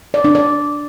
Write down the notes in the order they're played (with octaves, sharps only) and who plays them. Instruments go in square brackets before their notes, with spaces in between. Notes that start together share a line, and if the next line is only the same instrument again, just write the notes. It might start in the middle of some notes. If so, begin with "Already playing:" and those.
[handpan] D5
D4
D5